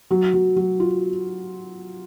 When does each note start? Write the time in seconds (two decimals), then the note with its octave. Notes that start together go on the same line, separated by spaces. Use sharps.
0.11 F#3
0.34 F#3
0.56 F#3
0.80 F4